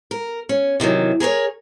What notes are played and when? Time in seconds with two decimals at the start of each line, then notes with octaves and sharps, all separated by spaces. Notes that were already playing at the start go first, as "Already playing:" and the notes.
0.11 A#4
0.49 C#4
0.80 C3 D#3 E3 F#3
1.20 G#4 A#4 C5 C#5